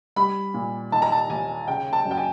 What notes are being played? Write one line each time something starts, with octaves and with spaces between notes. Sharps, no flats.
G3 B5
A#2
D#3 A5
A#5
A5
D#2 G#5
C#3 G5
A5
F#2
G5
G#5